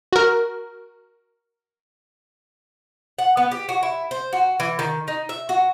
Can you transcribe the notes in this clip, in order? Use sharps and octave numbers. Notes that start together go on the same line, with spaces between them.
F#4 A#4
F#5
B3
G4
F#4
E4
C5
F#4
E3
D#3
D#4
E5
F#4